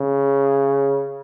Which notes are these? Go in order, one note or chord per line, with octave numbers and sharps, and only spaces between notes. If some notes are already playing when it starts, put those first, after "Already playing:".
Already playing: C#3